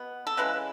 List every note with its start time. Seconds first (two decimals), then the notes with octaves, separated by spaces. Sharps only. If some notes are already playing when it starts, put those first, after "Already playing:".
Already playing: B2 B3
0.27 A4
0.37 C#3 E3 G#3 B4